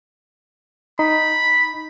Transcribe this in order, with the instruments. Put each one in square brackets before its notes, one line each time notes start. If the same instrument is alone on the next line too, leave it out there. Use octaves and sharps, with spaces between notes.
[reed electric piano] D#4 [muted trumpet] B5